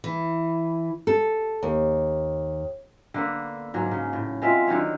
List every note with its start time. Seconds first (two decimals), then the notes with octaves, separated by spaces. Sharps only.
0.04 E3
1.07 A4
1.63 D#2
3.14 D3 A#3 B3
3.74 G#2 F#3 A#3
3.91 C#3
4.13 A2
4.42 G#3 C4 F4 E5
4.67 D3 D#3 F#3 C#5